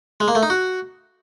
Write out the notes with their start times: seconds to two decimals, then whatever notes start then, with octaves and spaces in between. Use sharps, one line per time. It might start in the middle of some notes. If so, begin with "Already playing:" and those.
0.20 G#3
0.28 A#3
0.35 A3
0.43 D#4
0.50 F#4